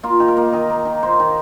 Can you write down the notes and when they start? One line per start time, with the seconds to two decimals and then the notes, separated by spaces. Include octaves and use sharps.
0.03 A#3 F4
0.20 D#3
0.28 A#4
0.37 A#3
0.53 D#3 D#5
0.70 A#3
0.85 D#3
1.03 A#3 C5
1.20 D#3